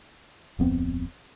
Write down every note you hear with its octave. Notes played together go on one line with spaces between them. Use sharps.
D1 F2 B3 C4